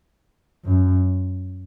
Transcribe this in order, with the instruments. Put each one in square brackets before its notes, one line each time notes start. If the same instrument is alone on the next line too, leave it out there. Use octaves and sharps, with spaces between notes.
[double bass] F#2